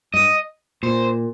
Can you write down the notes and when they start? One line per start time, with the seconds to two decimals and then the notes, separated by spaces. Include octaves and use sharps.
0.13 G2 D#5
0.83 A#2 C5